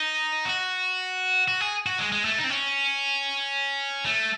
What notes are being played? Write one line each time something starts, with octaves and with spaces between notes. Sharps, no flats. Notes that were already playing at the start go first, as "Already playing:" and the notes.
Already playing: D#4
F#4
F#4
G#4
F#4
G#3
G#3
A3
D#4
C4
C#4
A3